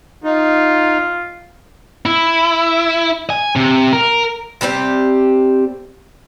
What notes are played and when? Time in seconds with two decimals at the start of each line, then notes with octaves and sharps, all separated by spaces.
0.24 D#4 F4
2.06 E4
3.30 G#5
3.56 C3
3.93 A#4
4.61 C3 G3 C4 G4